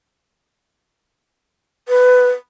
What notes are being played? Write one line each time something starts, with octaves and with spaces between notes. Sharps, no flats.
B4